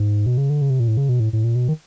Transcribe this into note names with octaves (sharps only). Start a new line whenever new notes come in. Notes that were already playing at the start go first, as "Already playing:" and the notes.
Already playing: G#2
B2
C#3
D3
C#3
C3
A#2
A2
C#3
B2
A2
A2
A#2
B2
D#3